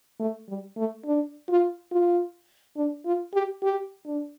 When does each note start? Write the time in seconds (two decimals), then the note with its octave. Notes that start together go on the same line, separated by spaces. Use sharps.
0.20 A3
0.49 G3
0.77 A3
1.05 D4
1.49 F4
1.92 F4
2.77 D4
3.06 F4
3.34 G4
3.63 G4
4.06 D4